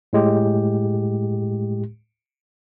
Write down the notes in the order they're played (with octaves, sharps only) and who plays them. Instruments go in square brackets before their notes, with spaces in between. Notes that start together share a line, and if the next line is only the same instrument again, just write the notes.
[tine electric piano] A2 G#3 G4